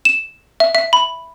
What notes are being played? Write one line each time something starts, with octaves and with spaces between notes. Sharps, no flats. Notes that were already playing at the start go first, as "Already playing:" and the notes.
E7
E5
E5
B5